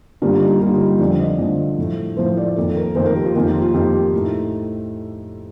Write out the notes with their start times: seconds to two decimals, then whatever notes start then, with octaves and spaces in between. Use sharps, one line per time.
0.22 G2 D3 G3 A#3 F4
0.41 D#4
0.60 G2 D3 G3 A#3 F4
0.74 D#4
0.86 G4
0.99 F2 D3 F3 D5
1.20 D#5
1.38 F2 D3 F3
1.78 A2 F3 A3
2.17 A2 F3 A3 C5
2.37 D5
2.56 F2 D#3 A#3 A4
2.76 A#4
2.95 F2 D#3 A#3 C5
3.06 A#4
3.15 G4
3.25 F4
3.35 F2 D#3 A#3 G4
3.48 F4
3.62 F4
3.74 F2 D#3 A#3 G4
3.93 G4
4.13 A2 A3 D#4